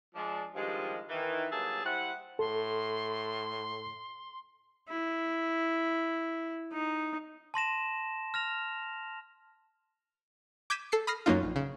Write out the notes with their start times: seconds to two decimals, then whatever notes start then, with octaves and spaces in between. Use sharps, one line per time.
0.15 F3 G#3 D4
0.55 G2 D#3 F3 G3 G#3
1.09 D#3 E3
1.52 G2 F#3 A#3 G#4 E5 A5
1.85 G3 E4 C5 F#5
2.39 A2 A4 C6
4.89 E4
6.73 D#4
7.54 A5 C6 A#6 E7
8.34 F6 A#6 F7
10.70 D6 G6 G#6 B6 D#7 E7
10.92 A4 C7 C#7
11.07 B5 D#6 F6 A#6 C7
11.26 F#2 F#3 A#3 D#4 F4
11.43 A#1
11.56 C#3